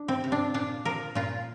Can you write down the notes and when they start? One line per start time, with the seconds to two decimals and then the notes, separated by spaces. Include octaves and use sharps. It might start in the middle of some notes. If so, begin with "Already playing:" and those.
Already playing: D4
0.08 C4
0.24 C3
0.32 D4
0.54 A#2 D4
0.85 F3 A#4
1.15 A#2 F4